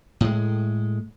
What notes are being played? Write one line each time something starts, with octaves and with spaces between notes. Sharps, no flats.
A2 G#3